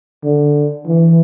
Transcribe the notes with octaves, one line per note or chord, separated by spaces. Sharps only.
D3
E3